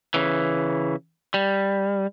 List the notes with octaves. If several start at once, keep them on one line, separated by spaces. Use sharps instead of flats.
C#3 E3
G3